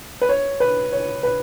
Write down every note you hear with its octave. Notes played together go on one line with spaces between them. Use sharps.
B4
C#5
B4
C#5
B4